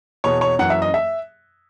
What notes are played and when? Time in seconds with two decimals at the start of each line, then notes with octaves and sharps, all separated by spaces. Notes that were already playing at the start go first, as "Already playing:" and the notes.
0.24 E2 B2 C#5
0.41 C#5
0.59 F#2 E3 F#5
0.70 E5
0.82 D#5
0.94 E5